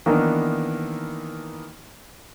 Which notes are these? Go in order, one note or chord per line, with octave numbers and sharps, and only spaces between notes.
D#3 E3 A#3 B3 D4 D#4